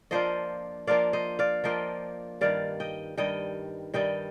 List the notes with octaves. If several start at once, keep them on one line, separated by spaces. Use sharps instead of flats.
F3 A#3 D4 F4 C5 D#5
F3 A#3 D4 F4 D5 F5
C5 D#5
D5 F5
F3 A#3 D4 F4 D#5 G5
G2 D#3 G3 D5 F5
D#5 G5
G2 D#3 G3 D#5 G5
G2 D#3 G3 D#5 G5